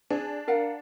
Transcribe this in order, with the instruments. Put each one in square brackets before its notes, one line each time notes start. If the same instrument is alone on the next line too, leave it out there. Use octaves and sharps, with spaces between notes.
[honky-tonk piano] D4 [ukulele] G#4
[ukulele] A#4 F5 F#5